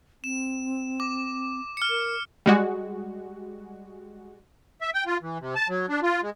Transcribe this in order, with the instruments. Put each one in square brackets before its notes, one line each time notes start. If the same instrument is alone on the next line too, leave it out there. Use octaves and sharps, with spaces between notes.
[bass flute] C4 [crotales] E7
[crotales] D6
F6 C#7
[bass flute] A#4
[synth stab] G3 G#3 F#4
[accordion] E5
G5
F4
E3
C3
A5
F#3
D4
F4
G#3